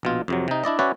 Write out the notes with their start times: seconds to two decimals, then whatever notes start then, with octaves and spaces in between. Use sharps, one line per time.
0.03 A#1 B2 F4
0.28 F2 C3 F#3
0.48 C3 D#4
0.64 D4 E4 D5 D#5
0.79 C#4 E4 F#4 B4 C#5 D5